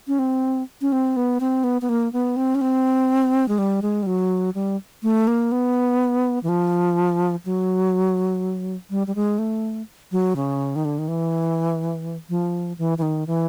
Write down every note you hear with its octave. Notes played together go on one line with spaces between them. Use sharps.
C#4
C4
C#4
C4
B3
C4
B3
B3
A#3
B3
C4
C#4
C4
G#3
G3
G#3
G3
F#3
G3
A3
A#3
B3
E3
F3
F#3
G3
G3
G#3
A3
F#3
C#3
D#3
D3
D#3
E3
F3
E3
E3
D#3
E3